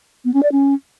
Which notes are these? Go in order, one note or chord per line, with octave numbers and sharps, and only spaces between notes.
B3
C#4
D5
C#4